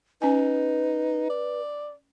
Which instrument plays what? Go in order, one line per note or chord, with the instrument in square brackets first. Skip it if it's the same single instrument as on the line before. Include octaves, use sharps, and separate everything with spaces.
[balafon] C#4 G#5 [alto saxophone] D#4 [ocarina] B4
[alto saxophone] D5